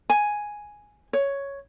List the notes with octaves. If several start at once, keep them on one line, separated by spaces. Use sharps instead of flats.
G#5
C#5